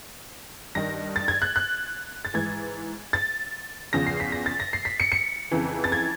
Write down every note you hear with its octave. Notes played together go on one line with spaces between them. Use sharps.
G2 D#3 A#6
A6
G#6
F#6
F#6
A6
G#2 E3 G#6
A6
E2 C#3 F3 A#6
C7
B6
A#6
A6
A#6
C7
B6
C#7
C#7
F2 C#3 E3
A6
G#6